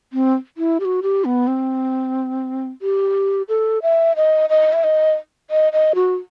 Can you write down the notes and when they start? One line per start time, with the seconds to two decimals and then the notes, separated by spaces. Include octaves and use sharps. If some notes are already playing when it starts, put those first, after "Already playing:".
0.13 C4
0.57 E4
0.80 G4
0.85 F#4
1.03 G4
1.25 B3
1.47 C4
2.82 G4
3.49 A4
3.82 E5
4.16 D#5
4.50 D#5
4.73 E5
4.84 D#5
5.50 D#5
5.73 D#5
5.95 F#4